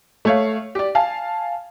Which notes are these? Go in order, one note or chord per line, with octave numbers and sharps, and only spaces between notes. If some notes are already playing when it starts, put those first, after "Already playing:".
A3 C#5 F5
G4 D5
F5 G#5 A5